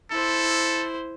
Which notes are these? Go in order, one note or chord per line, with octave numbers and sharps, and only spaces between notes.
E4 A4 C5